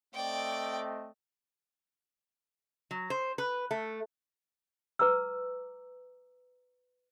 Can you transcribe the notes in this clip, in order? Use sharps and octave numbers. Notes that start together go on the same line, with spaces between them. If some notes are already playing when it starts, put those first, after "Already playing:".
A3 C4 D5 D#5 G5
F#3
C5
B4
A3
B4 A#5 D6 E6